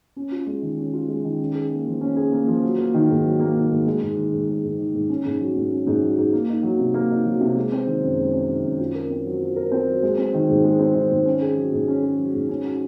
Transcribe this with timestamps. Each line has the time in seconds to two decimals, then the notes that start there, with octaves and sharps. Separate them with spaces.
0.16 C#4
0.31 F4
0.47 G#3
0.62 D#3
0.78 C#4
0.94 F4
1.08 G#3
1.24 D#3
1.39 C#4
1.55 G#4
1.71 A#3
1.86 F3
2.01 C#4
2.16 G#4
2.32 A#3
2.48 F3
2.63 F#3
2.79 A#3
2.94 D#3
3.10 G#2
3.25 F#3
3.39 A#3
3.55 D#3
3.71 G#2
3.86 G#3
4.01 G#2
4.17 D#3
4.32 G#2
4.48 G#3
4.63 G#2
4.79 D#3
4.94 G#2
5.09 C#4
5.25 G#2
5.40 F#3
5.56 G#2
5.72 C#4
5.87 G#2
6.02 F#3
6.18 G#2
6.32 A#3
6.49 D#4
6.63 F#3
6.79 C3
6.94 A#3
7.10 D#4
7.25 F#3
7.41 C3
7.56 G#3
7.72 C4
7.86 D#3
8.02 F#2
8.17 G#3
8.33 C4
8.48 D#3
8.64 F#2
8.80 F4
8.95 A#4
9.10 C4
9.26 F#3
9.41 F4
9.56 A#4
9.72 C4
9.88 F#3
10.03 G#3
10.18 C4
10.34 D#3
10.49 G#2
10.64 G#3
10.79 C4
10.95 D#3
11.11 G#2
11.26 C#4
11.42 G#4
11.57 F#3
11.72 G#2
11.88 C#4
12.03 G#4
12.18 F#3
12.34 G#2
12.49 C#4
12.64 F#4